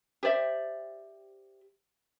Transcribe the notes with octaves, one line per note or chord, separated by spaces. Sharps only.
G4 C5 D5 E5